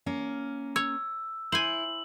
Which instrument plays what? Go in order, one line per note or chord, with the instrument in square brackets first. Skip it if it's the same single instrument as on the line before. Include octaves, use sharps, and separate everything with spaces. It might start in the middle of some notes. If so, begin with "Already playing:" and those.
[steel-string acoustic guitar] A#3 C#4 A#4
[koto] C#5 [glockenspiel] E6
[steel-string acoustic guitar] E4 [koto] C5 G#5 [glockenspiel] F#7